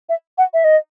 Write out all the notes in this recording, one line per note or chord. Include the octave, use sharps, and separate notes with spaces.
E5
F#5
E5
D#5